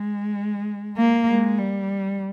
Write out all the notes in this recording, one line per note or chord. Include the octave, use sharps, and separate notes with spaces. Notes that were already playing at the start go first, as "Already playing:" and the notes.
Already playing: G#3
A#3
G#3
G3